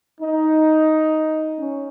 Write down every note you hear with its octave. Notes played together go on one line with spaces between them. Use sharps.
D#4
C#4